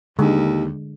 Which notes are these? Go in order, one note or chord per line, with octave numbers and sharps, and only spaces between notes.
D#2 D3 G#3